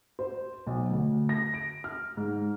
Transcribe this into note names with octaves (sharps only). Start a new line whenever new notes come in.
C5
B1
D2
A#6
D7
F6
G#2